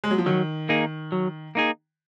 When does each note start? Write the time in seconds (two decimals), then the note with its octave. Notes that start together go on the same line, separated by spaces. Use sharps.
0.04 G#3
0.11 F#3
0.18 F3
0.26 D#3 F#3
0.69 A#3 D#4 G#4
1.12 F#3
1.55 A#3 D#4 G#4